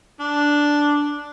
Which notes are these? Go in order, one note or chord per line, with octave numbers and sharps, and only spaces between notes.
D4